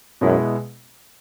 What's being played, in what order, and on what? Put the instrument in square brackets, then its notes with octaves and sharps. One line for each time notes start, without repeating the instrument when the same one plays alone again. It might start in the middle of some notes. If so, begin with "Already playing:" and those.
[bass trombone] F#2 [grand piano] B2 G#3 B3 E4